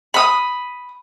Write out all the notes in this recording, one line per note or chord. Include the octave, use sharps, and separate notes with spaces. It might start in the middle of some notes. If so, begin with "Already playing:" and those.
B5 D#6